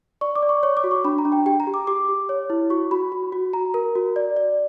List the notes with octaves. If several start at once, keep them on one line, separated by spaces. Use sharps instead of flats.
D5 C#6
D6
D5
C#6
C#5 C#6
D6
F#4
C#6
D4 B5
A#5
D4
G5
G4 G5
A#5
G4
D6
G4 D6
G4
C#5
E4
F#4 C#6
F#4 B5
F#4
F#4
F#4 A#5
A#4
F#4
D5
D5